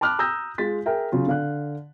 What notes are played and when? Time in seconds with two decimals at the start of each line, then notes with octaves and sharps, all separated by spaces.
0.01 A5 B5 D6 F6 F#6
0.19 A#5 D#6 E6 F#6 G6 A#6
0.58 G#3 F4 A6 B6
0.86 G#4 A#4 E5 G5
1.12 C#3 F#3 F4
1.27 D3 F5 F#6